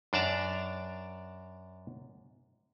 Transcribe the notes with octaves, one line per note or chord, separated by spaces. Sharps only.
F#2 D4 D5 A5 A#5